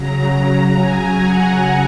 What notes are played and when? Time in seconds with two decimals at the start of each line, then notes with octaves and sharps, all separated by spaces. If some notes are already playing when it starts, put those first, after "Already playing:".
Already playing: C#3 F#3 A#5
0.78 G#5
1.21 F#5